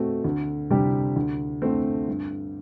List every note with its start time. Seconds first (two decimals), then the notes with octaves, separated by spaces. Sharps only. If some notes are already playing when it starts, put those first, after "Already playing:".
Already playing: B2 A3 C4 F#4 A4
0.24 D2
0.70 C3 G3 D4 G4
1.16 D2
1.62 D3 A3 C4
2.08 G2